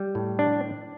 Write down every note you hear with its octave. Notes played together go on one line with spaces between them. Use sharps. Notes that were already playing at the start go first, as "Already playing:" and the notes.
Already playing: G3
A2
D4